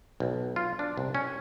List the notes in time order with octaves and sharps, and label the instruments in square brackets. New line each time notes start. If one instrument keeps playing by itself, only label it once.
[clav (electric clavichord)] B1
F4
D4
C2
C#4